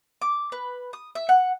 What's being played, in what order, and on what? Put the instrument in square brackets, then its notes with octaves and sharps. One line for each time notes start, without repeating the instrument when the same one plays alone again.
[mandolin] D6
B4
D#6
E5
F#5